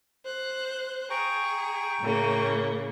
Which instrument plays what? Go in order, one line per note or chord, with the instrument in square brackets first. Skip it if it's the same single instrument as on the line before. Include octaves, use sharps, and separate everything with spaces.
[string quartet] C5 F#6
[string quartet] G#4 [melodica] G5 A#5 C#6
[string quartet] A2 C#3 A#3